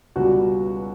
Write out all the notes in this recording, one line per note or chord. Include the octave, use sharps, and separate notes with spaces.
C#2 B2 G3 F#4